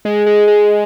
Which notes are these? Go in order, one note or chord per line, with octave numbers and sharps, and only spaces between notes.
G#3
G#3
G#3